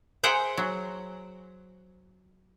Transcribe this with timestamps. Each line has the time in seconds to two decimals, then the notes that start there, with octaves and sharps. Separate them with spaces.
0.23 G#4 C5 E5 F#5 G5 A#5
0.57 F#3